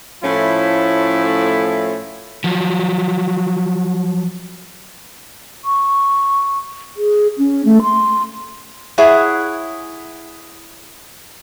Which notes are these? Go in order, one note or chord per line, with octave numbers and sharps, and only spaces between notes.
A2 F3 A3 C#4 E4
F3 F#3
C#6
G#4
C#4
A3
C6
E4 G#4 C#5 F#5